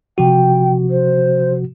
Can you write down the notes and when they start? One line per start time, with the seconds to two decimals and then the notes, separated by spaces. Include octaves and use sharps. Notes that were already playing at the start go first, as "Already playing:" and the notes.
0.18 C3 F3 F#4 G5
0.89 C5